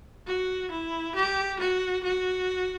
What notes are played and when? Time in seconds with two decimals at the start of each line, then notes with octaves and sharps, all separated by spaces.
0.27 F#4
0.71 E4
1.16 G4
1.59 F#4
2.04 F#4